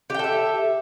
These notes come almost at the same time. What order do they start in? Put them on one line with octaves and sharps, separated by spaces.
G4 G5 A4 E5